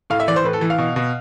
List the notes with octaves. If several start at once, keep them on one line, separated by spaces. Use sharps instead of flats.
A2 F5
E5
E3 D5
C5
A2 B4
A4
E3
F5
B2
B2